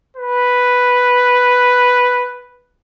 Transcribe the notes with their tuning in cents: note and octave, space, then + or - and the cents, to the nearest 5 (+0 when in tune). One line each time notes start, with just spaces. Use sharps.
B4 +0